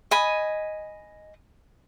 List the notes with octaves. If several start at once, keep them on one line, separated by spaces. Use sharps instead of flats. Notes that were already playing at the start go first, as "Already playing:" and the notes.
D#5 G#5 B5